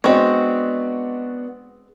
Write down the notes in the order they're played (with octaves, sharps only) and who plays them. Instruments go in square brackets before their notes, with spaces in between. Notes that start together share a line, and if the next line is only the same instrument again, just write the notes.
[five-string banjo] G#3 C4 [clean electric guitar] B3 [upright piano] D4 F#4 D5 [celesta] D#5 C#6